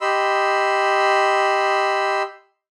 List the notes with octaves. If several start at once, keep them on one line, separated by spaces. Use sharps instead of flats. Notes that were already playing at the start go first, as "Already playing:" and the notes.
G4 D#5 B5 C6 E6